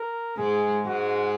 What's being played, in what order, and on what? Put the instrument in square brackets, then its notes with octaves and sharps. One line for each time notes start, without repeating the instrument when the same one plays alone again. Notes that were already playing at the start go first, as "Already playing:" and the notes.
Already playing: [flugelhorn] A#4
[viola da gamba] G#2 G#3 [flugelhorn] G#4
[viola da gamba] G#2 G#3 [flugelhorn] F#4